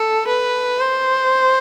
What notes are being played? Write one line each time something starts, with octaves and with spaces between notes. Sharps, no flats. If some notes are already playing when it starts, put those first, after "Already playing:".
Already playing: A4
B4
C5